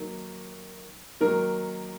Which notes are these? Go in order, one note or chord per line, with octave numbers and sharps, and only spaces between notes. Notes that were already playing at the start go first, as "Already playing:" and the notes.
Already playing: D#3 F#3 A#3
D#3 F#3 A#3 A#4